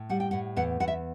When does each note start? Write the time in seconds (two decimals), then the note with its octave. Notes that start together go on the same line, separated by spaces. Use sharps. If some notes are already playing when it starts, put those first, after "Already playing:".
Already playing: A2
0.09 G3 F#5
0.20 G5
0.31 A2 F#5
0.56 E2 F#5
0.80 E2 F#5
0.88 E5